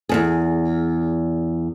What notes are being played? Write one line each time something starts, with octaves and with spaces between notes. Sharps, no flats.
E2 G#2 G#4